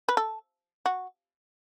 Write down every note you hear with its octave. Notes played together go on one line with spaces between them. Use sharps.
B4
A4
F#4